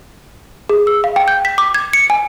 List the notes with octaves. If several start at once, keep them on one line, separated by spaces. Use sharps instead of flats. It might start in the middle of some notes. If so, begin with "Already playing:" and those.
G#4
E6
F5
G5
G6
B6
D6
G#6
C#7
G#5